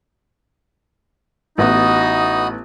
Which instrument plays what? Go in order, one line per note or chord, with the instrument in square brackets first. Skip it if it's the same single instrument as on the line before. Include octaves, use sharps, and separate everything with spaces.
[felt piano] A1 B3 [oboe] D#4 [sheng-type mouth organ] F#4 D#5 B5